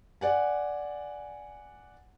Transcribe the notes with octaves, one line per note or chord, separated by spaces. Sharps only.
D5 F#5 G#5